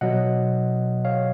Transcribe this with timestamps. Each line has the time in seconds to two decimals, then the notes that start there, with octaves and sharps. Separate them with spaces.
0.01 B2 F#3 D#5 F#5
1.05 C#5 F5